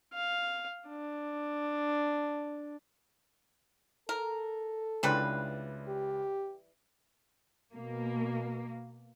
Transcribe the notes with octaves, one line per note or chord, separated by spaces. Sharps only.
F5
D4
A4 A#4
C#2 E3 G3 D4 B4 C6
G4
B2 A#3